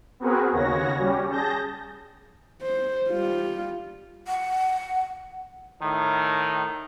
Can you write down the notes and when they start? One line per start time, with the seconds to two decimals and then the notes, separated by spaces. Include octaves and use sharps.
0.20 B3 C4 F#4 G#4 A#4 B4
0.52 D#2 C#3 F#4 C#5 A#6
0.98 G3 C#4 G4
1.29 G#4 A5 G6 A#6
2.62 C5
3.09 G3 F4
4.28 F#5
5.81 A2 D#3